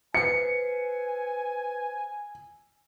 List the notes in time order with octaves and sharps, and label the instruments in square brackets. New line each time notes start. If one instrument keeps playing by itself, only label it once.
[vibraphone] B4 C5 [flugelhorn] G#5 [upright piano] C#7